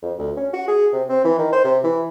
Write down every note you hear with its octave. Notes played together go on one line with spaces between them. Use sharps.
F2
D2
C#4
F#4
G#4
C3
C4
E3
D#3
C5
C3
E3